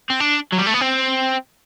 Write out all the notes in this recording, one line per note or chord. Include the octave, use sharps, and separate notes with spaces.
C4
D4
F#3
G3
A3
B3
C4